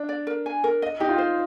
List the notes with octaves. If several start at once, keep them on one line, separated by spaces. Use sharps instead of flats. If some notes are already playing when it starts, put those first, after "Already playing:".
Already playing: D4
D5
A#4
G#5
A#4
D#5
D#4 G4
F4
C5